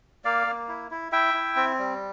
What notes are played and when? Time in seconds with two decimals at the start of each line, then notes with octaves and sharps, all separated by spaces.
0.25 A#3 D5 F5
0.47 A#3
0.69 E4
0.91 E4
1.12 E4 E5 G5
1.34 E4
1.56 C4
1.79 G3